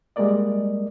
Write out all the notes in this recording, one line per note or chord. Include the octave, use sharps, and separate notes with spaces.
G3 G#3 A#3 A#4 D5 D#5